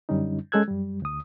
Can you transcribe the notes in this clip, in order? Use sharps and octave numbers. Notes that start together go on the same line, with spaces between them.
F#2 D3 G3 C#4 D#4
G#3 C#4 A4 E6 F#6 G#6
F#2 G3
D2 D#6